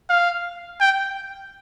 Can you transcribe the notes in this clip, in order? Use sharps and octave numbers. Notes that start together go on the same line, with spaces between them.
F5
G5